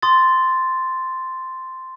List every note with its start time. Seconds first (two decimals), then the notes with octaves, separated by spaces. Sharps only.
0.02 C6 D#6 A6